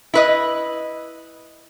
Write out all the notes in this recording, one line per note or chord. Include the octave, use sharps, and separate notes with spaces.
E4 B4 D#5